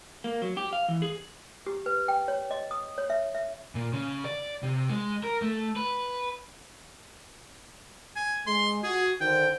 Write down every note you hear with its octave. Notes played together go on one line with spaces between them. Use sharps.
A#3
F#3
G4
F5
E3
G#4
G4
B4
G5
C#5
D#5
D#6
C#5
E5
E5
A#2
C#3
D5
C3
G#3
A#4
A3
B4
G#5
G#3 C6
F#4 G#4
D3 D#3 C5 G5